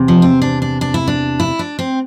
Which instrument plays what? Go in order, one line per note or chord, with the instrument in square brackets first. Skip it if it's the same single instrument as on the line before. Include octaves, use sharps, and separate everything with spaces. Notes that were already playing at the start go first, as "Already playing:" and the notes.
Already playing: [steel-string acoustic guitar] E2 C3
F3
C4
D4
D4
D4
E4
D4
E4
D4
C4